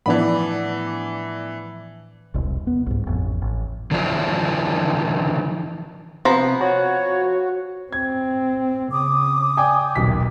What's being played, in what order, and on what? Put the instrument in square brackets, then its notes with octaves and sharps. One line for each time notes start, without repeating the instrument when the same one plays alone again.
[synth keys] A2 F3 [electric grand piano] E3 B5 [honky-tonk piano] B3 D4 D5
[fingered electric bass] E1 C2
B3
C2 G#2
A1 F2
A1
[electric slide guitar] D3 E3 F3 D4 E4 F4
[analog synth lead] C3 [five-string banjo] F3 B3 A#5
[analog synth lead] F#4 [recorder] C#5
[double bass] C4 [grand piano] G#6
[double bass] C#3 [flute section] D6 D#6
[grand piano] D5 G5 G#5
[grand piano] D#1 B1 B6 [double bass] B2